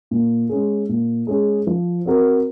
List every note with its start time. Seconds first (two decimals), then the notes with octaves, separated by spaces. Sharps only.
0.11 A#2
0.49 G#3 C#4 G#4
0.89 A#2
1.27 G#3 C#4 G#4
1.67 F3
2.06 C4 F#4 A#4